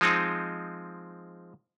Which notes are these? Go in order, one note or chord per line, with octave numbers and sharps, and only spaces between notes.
F3 G#3 C4 D#4